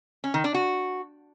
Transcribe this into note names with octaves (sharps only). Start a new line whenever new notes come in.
C#4
D#3
D4
F#4